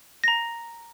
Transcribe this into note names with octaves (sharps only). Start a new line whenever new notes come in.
A#5 A#6